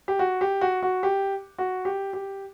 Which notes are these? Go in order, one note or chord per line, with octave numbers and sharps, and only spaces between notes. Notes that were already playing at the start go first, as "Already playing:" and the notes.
G4
F#4
G4
F#4
F#4
G4
F#4
G4
G4